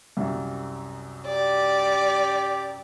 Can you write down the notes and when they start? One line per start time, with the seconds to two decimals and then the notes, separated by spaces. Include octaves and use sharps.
0.17 C2 F#2
1.26 G4 D5